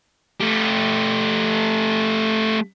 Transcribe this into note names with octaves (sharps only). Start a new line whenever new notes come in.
A3 G4